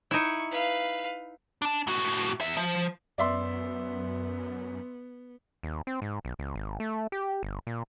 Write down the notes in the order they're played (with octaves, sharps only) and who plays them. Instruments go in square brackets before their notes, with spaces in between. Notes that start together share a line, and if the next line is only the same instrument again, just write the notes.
[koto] D#4 E4 [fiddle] C#6
[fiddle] B4 F5
[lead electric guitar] D4 A5
A2 F#4
E2 E5
F3
[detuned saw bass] F#2 [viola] B3 [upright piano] D5 E5 C6
[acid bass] D#2
C4
G#2
B1
C#2
G#1
A3
G4
G1
A#2